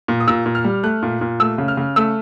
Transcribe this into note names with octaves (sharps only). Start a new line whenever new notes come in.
A#2
D#6
A#2 E6
A#2
F6
G3
A3 F#6
A#2
A#2
A3 E6
C#3
F6
C#3
A3 E6